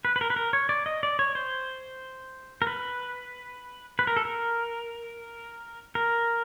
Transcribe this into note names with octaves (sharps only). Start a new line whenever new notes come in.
B4
B4
A#4
B4
A#4
C#5
D5
D#5
D5
C#5
C5
A#4
B4
B4
A#4
A4
A#4
A#4